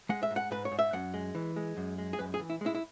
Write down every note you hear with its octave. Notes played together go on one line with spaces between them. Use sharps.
G#3 F#5
E5
G#2
F#5
G#2 B4
C#5
G#2
E5
F#2 F#5
G#3
E3
G#3
F#2
G#3
G#4
F#2 B4
G#4
E3
E4
G#3 E4
E4